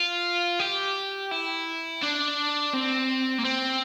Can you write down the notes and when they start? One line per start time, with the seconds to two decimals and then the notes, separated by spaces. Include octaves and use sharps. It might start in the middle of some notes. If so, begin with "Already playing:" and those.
Already playing: F4
0.59 G4
1.31 E4
2.03 D4
2.74 C4
3.39 A#3
3.45 C4